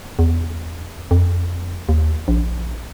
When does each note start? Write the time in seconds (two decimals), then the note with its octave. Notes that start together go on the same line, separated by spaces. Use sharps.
0.19 E2
1.11 F2
1.89 D#2
2.28 A#1